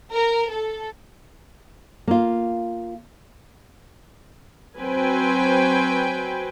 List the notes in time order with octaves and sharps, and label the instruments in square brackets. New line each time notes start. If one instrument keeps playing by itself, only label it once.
[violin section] A#4
A4
[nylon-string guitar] A#3 F4
[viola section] F#3 C4 B4 C5 G5 G#5